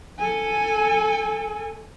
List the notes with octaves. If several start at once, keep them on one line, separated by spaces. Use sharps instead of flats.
A4 G#5